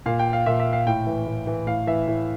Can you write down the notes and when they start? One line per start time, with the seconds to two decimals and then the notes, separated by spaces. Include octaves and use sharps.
0.06 A#2 F5
0.19 G5
0.33 F5
0.46 A#2 E5
0.60 E5
0.73 F5
0.87 A2 G5
1.07 E3
1.27 A2
1.47 E3
1.67 A2 F5
1.87 E3 E5
2.07 A2